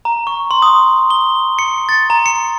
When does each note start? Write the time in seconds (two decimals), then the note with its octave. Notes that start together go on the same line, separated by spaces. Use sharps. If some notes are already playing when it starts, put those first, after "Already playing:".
0.05 A#5
0.27 C#6
0.51 C6
0.62 D#6
1.10 G7
1.59 C#7
1.89 A6
2.10 A#5
2.26 C#7